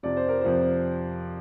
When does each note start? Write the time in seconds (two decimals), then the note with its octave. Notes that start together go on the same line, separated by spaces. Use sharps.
0.03 F2 C3 F3 D5
0.17 C5
0.29 A#4
0.41 F2 C3 F3 C5